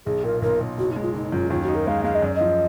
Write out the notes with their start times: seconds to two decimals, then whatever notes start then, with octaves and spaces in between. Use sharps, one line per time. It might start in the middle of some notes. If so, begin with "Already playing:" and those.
0.06 B1 G#4
0.24 A#2 A#4
0.42 B1 A#4
0.61 B1
0.77 F#1 F#4
0.91 D#4
0.96 G#3
1.02 F4
1.14 F#1 D#4
1.32 F#2 F4
1.50 D#2 F4
1.63 F#4
1.68 D#4
1.75 A#4
1.87 G#3 F5
2.04 G#3 F5
2.15 D#5
2.22 F#2 D5
2.35 D#5
2.41 F3